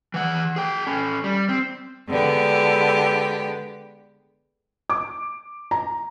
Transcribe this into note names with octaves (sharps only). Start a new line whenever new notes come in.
E3 F#5
G#4 G5
C#4 A4
G3
C4
D3 G#3 B3 G4
D6
A#5